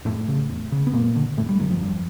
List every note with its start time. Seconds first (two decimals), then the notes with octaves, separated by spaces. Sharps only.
0.05 F2 A2 A3
0.28 C#3
0.49 E2
0.72 C#3
0.87 B3
0.93 F#2 A#2 A#3
1.16 D3
1.37 F2 A2 A3
1.49 G2 G3
1.59 F#2 D3 F#3
1.70 F2 F3
1.82 G2